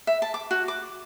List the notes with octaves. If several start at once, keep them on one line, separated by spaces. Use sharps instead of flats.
E5
A5
D6
F#4
D6